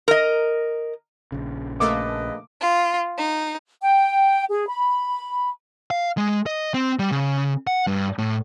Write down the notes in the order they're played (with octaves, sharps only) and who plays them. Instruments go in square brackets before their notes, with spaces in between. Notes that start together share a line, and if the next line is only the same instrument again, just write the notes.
[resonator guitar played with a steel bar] A#4 D#5
[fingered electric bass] A#1 C#3
[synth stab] A3 A#3 A4 [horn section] G#4 B4 D#5 [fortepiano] D6
[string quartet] F4
D#4
[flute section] G5
G#4
B5
[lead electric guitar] F5
G#3
D#5
C4
G3
C#3
F#5
G2
A2